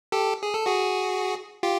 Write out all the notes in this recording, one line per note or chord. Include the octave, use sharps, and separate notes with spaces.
G4 A4
G#4
A4
F#4 G#4
F4 G4